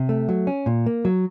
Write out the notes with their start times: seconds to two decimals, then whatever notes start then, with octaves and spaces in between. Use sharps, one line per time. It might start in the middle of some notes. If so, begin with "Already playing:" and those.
Already playing: C3
0.09 A3
0.29 F#3
0.47 C#4
0.66 A#2
0.86 A#3
1.05 F#3